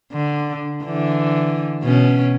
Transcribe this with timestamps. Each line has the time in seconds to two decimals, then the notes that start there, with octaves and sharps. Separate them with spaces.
0.12 D3
0.84 D3 E3
1.83 B2 B3 C#4